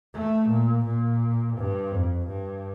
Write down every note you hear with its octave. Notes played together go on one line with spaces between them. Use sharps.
A3
A#2
A#2
G2
F2
G2